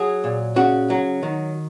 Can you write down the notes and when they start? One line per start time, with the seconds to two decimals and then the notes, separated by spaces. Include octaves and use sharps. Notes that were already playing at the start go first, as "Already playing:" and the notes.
Already playing: F#3 G#4
0.24 A#2
0.56 C#3 F#4
0.90 F#3
1.23 D#3